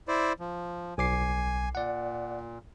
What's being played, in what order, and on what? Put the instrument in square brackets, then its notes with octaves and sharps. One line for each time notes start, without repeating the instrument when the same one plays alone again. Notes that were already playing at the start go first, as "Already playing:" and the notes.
[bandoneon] E4 C5 D5
F3
[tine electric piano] B1 D6 C7 [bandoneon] G#5
[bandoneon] A#2 [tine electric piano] D5 F#5